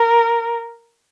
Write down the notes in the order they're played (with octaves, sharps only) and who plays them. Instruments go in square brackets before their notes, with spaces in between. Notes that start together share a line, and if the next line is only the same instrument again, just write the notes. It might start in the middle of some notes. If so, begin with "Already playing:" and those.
Already playing: [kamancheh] A#4